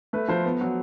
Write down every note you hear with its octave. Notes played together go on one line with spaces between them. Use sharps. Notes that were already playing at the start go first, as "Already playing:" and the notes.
A3 B4
F3 C5
B3
F#3